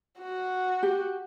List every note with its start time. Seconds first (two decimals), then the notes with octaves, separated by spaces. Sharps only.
0.19 F#4
0.83 G4